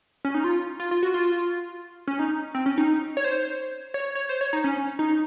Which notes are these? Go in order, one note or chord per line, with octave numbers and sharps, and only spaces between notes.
C#4
D#4
F4
F4
F4
F#4
F4
C#4
D#4
C4
C#4
D#4
C#5
C5
C#5
C#5
C5
C#5
D#4
C#4
D#4